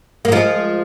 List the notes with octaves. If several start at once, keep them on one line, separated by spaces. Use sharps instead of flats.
A#3
F3 G#3